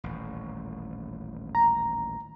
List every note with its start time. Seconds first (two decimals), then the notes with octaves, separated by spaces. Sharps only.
0.04 D#1 A1
1.55 A#5